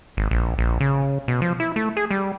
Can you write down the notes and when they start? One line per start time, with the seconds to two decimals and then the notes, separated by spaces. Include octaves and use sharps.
0.17 G#1
0.31 A#1
0.58 A#1
0.80 C#3
1.28 B2
1.42 F3
1.60 E4
1.76 A3
1.97 G#4
2.11 G3